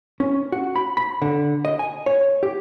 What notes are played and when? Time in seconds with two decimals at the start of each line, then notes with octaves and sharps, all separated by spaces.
0.20 C#4
0.52 F#4
0.76 B5
0.97 B5
1.22 D3
1.65 D#5
1.79 G#5
2.06 C#5
2.43 G4